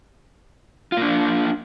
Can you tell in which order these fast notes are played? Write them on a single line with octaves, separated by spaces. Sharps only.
F4 A#3 D4